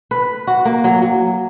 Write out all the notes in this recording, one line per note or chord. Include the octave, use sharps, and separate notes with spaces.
B4
F#4
A#3
F#3
F#3